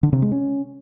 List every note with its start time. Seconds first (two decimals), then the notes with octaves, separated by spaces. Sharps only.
0.03 D3
0.13 C3
0.22 G#3
0.32 C#4